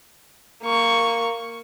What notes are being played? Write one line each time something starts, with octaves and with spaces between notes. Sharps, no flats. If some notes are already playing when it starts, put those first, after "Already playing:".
A#3 C#6